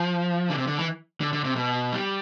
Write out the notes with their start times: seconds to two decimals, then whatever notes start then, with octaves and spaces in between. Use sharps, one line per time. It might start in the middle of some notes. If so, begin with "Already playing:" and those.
Already playing: F3
0.50 D3
0.58 C3
0.67 D3
0.77 E3
1.21 D3
1.33 D3
1.45 C3
1.56 B2
1.92 G3